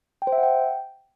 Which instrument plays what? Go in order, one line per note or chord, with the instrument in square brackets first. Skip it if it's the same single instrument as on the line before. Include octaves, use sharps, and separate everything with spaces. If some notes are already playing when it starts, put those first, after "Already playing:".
[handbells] G5
C5
E5
F#5
G5